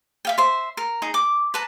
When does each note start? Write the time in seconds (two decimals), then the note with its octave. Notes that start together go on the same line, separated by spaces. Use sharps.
0.25 E5 F5 G5
0.38 C5 E5
0.77 A#4
1.02 D#4 G#4 A#5
1.14 D6
1.54 B4 A5 A#5